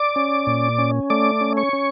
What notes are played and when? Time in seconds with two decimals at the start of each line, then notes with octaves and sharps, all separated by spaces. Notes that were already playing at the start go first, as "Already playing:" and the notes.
Already playing: D5 D6
0.16 C#4
0.47 A#2
0.78 C#4
1.10 A3 D5 D6
1.41 C#4
1.57 C#5 C#6
1.73 C#4